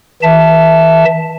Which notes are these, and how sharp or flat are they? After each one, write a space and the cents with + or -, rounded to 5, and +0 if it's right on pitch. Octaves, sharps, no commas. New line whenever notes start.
E3 -35 E5 +0 A5 +0